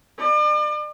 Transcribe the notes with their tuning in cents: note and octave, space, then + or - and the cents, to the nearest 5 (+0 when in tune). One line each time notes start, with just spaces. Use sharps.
D5 +40